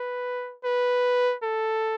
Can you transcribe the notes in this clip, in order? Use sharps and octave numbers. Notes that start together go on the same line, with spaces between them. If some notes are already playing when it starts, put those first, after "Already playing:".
Already playing: B4
B4
A4